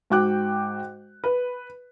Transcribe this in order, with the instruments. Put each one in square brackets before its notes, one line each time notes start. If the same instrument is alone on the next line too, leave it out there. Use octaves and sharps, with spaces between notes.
[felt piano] G#2 F#4 G5 D6 F#6
B4